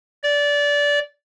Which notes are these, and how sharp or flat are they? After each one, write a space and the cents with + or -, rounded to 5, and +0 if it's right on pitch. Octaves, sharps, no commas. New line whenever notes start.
D5 -20